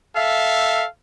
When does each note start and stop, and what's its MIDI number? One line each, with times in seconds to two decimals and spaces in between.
0.16 0.85 69
0.16 0.85 76
0.16 0.85 77